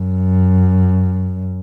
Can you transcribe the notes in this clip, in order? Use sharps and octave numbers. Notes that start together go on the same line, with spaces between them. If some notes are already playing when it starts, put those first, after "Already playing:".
Already playing: F#2